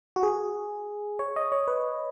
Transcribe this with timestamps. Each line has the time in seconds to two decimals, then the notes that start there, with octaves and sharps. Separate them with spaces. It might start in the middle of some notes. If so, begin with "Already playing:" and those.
0.16 F#4
0.23 G#4
1.19 C#5
1.36 D#5
1.52 C#5
1.68 B4